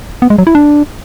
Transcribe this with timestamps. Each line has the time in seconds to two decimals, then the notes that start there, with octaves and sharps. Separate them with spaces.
0.22 B3
0.30 G#3
0.38 F#3
0.47 E4
0.55 D4